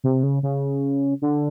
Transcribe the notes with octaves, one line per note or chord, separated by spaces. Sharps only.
C3
C#3
C#3
D3